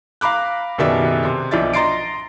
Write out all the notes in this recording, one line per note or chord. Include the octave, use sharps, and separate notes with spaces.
F5 A#5 B5 D6 F#6
F#1 B2 D#3 G4 D5 E5
C3
B1 F3 D4 E5 A6
D#5 A#5 C6 A6 C7 D7